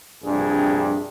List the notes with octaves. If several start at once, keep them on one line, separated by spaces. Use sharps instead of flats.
A#1 G2 C3 G#4